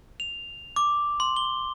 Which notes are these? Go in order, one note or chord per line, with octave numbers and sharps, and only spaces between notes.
F7
D6
C6
G7